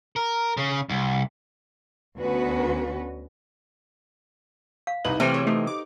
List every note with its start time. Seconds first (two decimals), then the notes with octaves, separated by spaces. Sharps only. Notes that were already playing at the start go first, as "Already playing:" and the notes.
0.16 A#4
0.57 C#3
0.89 C2
2.16 D2 B3 C#4 F#4 B4
4.87 F5
5.05 C2 D#4 B4 F#7
5.20 C3 E3 A3 C4 B4 C5 G5 F6
5.34 G#4 B4 C#5
5.47 A3 D#4 G4 A4
5.67 D6